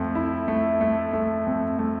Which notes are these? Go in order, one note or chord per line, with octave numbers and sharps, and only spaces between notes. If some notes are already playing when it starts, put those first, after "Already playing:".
Already playing: F2 A3
E4
A3
A3
A3
F2
A3